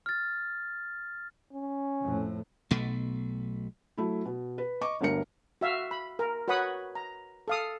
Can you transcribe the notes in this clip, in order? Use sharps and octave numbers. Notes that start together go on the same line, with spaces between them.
F6 A6
C#4
F2 A2
B1 B2 A3
F#3 A3 E4
B2
B4
D#5 C#6 D6
G1 D2 G2 A#4 C#7
F#4 E5 F5
B5
A#4
F#4 B4 C#5 F#5 B5 D#6
A#5
A4 F5 D#6